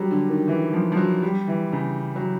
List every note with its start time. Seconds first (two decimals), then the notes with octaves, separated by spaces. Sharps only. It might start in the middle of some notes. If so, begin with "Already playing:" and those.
Already playing: F#3 G3
0.11 D3
0.30 D#3
0.48 E3
0.73 F3
0.92 F3
0.97 F#3
1.23 G3
1.48 E3
1.72 C#3
2.16 F#3